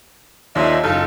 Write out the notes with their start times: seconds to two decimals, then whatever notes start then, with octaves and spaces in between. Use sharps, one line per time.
0.55 D#2 A#2 D#5 E5
0.84 F#1 D#4 F4 A4